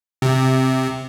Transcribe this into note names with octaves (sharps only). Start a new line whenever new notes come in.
C3